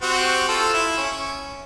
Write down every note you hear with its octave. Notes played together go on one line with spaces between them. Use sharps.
C4 F#4 G4
F4 A4
E4
C#4